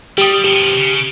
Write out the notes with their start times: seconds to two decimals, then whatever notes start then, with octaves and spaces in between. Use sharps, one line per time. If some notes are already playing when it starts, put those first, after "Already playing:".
0.18 G3 G4 D#6
0.44 B2 F3 G4
0.77 C#3